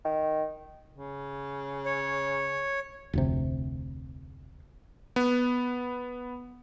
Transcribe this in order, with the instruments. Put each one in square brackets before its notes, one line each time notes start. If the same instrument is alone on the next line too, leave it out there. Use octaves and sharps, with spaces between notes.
[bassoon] D#3
[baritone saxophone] C#3
[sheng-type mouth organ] C#5
[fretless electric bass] F1 D2 C3
[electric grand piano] B3